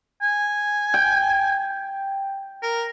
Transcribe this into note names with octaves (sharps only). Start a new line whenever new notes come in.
G#5
G5
A#4